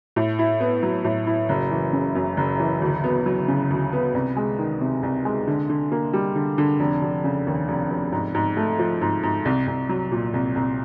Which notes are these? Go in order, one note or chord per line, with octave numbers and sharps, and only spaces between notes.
A2
E4
B3
F#3
A2
E4
F#1
E3
C#3
F#2
F#1
E3
D2
B3
F#3
C#3
D2
B3
C2
G#3
D#3
C3
C2
G#3
D3
D3
A#3
G3
D3
D3
F1
F1
C#3
D#2
F1
F1
G#2
G#2
A3
F3
G#2
G#2
C2
C2
F#3
A#2
C2
C2